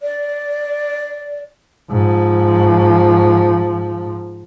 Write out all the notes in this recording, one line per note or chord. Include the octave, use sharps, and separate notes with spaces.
D5
G#2 F3